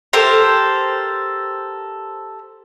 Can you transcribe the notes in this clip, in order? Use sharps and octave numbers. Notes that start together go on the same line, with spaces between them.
G4 A4 A#4 C5